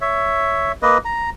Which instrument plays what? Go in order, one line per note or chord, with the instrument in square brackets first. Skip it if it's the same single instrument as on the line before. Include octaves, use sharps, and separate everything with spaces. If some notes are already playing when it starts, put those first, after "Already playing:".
[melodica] C#5 E5
A#3 B4 D#5
A#5